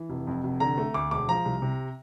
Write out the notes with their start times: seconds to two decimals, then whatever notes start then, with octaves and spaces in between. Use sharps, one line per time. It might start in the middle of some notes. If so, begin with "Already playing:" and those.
Already playing: E3
0.10 F1
0.27 F2
0.44 F1
0.60 D3 A#5
0.78 A3
0.94 D2 D6
1.11 E1 D6
1.28 F3 A#5
1.46 C2
1.62 C3